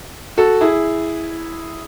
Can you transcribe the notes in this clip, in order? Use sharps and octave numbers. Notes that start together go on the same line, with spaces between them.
F#4 A4
E4 G#4